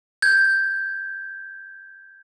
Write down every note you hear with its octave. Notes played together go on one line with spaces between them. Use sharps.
G6 G#6